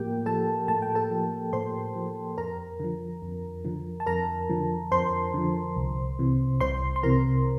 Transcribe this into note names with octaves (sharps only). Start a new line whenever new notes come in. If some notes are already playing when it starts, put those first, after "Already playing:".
Already playing: A2 F3 A#3 G4 A#4 G5
F3 A4 A5
A2 A5
G5
A4 A5
F3
A2 C5 C6
F3
F2 A#4 A#5
D3 F3
F2
D3 F3
A5
F2 A#4 A#5
D3 F3
F2 C5 C6
D3 F3
C2
C3 E3
C2 C5 C6
C6
C3 E3 A#4 A#5